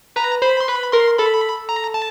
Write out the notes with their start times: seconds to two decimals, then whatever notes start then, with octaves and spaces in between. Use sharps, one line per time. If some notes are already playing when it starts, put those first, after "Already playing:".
0.16 B4 A#5
0.42 C5 B5
0.61 C6
0.68 B4 B5
0.92 A#4 C6
1.18 A4 B5
1.69 A#5
1.94 A5